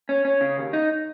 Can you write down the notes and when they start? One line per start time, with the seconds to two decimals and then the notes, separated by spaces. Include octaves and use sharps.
0.09 C#4
0.25 C#4
0.41 C#3
0.57 D#2
0.73 D#4